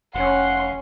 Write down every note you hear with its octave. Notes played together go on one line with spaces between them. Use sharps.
F1 C#4 F#5 C6